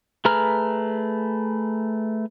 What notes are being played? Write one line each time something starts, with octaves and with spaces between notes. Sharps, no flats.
A3 G#4 B4 A#5 F6